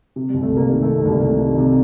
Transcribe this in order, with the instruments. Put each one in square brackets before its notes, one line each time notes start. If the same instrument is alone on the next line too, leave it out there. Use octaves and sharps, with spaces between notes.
[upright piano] C3
G3
C2
A3
C2 A#3
D#3 G3
A3
C3
A3
C2 G3
C2 A3
D#3
C3